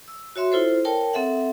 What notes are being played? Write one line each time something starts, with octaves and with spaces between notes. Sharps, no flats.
E6
F#4 C#5 E5 C6
E4 F4 A4 C5
A#4 C#5 G5 A5
C4 A4 E5 F#5